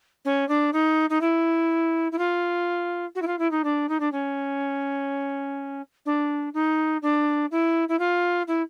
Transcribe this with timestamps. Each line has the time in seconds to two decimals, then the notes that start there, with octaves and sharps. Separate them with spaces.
0.25 C#4
0.48 D4
0.73 D#4
1.10 D#4
1.21 E4
2.12 E4
2.18 F4
3.15 F#4
3.22 E4
3.27 F4
3.39 E4
3.51 D#4
3.64 D4
3.89 D#4
4.00 D4
4.12 C#4
6.05 D4
6.54 D#4
7.02 D4
7.51 E4
7.88 E4
7.99 F4
8.47 E4